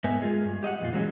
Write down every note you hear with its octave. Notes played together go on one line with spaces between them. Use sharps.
G#2 B3 A#4 D#5 E5 G#5
G#3 F4 G#4
G2
G4 D#5 F5 F#5
F2 A#2 F4
E3 F#3 G#3 C4 C#4